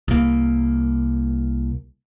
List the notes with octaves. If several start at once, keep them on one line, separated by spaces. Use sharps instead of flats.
C2 A#3